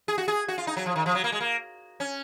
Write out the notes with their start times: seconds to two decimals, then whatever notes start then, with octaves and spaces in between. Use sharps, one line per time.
0.08 G#4
0.18 F#4
0.28 G#4
0.48 F#4
0.58 F4
0.67 D#4
0.77 F#3
0.86 F3
0.96 D#3
1.06 F3
1.15 F#3
1.24 A#3
1.32 G#3
1.41 A#3
2.00 C#4